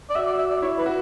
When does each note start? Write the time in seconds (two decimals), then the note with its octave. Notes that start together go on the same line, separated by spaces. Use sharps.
0.10 D5
0.15 F#4 E5
0.27 D5
0.38 E5
0.50 D5
0.62 E4 C#5
0.78 B4
0.86 F#4